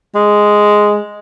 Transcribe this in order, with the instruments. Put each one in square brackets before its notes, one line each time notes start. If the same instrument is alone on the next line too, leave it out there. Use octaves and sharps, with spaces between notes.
[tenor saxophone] G#3